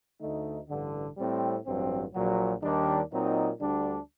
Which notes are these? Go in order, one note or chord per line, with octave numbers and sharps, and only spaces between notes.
D2 D3 A3 D#4
A1 G2 D3
A2 G3 C4
A1 G2 F#3 C4
A#1 A#2 F#3
D#2 D#3 G3 D4
A#2 F#3 C4 D#4
D2 D3 G3 D4